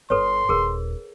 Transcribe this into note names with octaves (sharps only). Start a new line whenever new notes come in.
G1 A4 B4 C#5 C6
D#1 D#2 G#4 A#4